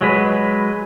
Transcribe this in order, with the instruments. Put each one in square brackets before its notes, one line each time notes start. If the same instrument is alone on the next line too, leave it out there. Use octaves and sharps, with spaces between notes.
[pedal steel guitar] F#3 G#3 B4